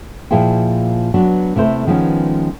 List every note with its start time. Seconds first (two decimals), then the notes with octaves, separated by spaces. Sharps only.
0.31 A#2 F3 E4 G#4 C5 G5
1.14 F#3 B3 D4
1.56 C3 A3 E4 C5
1.87 D#3 F3 G#3 B3 C#4